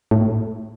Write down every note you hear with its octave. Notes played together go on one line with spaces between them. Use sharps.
A2